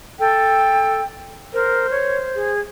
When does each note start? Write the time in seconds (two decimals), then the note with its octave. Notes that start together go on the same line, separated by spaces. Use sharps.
0.19 A4 G5
1.53 A#4 C5
1.90 C#5
2.35 G#4